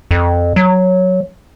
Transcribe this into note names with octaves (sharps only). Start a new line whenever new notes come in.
F2
F#3